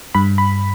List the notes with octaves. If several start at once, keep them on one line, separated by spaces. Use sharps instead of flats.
G2 B5
B5